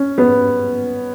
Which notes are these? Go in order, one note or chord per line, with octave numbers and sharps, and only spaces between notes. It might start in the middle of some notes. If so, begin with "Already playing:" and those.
Already playing: C#4
B3